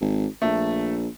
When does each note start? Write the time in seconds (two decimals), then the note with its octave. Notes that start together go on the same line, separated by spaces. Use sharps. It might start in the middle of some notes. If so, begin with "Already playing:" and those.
0.01 G#1
0.42 A#1 A3